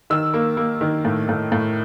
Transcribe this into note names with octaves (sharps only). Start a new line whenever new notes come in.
D#3 E6
A#3
A#3
D#3
A2
A2
A2